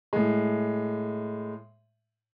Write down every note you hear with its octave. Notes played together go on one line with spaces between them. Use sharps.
A2 G#3